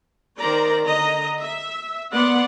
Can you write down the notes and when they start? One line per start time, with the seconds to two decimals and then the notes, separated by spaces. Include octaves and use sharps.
0.39 D#3 A#4 C5 D5 A#5
0.86 D3 D#5 A#5
1.41 E5
2.13 B3 D5 F#5 C6